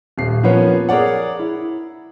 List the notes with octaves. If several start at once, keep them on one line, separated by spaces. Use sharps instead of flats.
D#1 C7
F3 A#3 B3 C#4 C#5
G#4 A#4 C#5 D5 F#5
E4